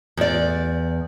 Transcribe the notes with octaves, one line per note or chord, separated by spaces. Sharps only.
E2 D5